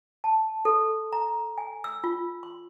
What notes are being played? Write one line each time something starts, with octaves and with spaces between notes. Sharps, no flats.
A5
A4
A#5
G#5
E6
F4
C6